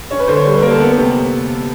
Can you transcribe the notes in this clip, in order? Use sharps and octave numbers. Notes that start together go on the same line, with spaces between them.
C#4 C#5
B4
D3 C5
C#5
G3
B4
A#3 A#4
A4
B3
C3